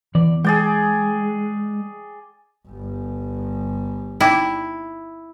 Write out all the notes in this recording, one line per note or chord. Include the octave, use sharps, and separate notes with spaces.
E2 E3 D5
G#3 G#4 D5 G5
G1 G3
D#4 E4 G5 D6